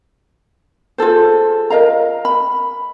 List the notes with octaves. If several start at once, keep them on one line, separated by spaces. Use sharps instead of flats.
F4 G#4 A4 C5
A#4 D#5 F5 A#5
B5